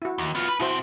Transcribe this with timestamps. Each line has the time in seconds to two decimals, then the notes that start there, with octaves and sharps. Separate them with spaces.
0.02 E4 F#4
0.18 D#2
0.35 B3 F4
0.49 B4
0.60 B2 C4 E4 F#4 C5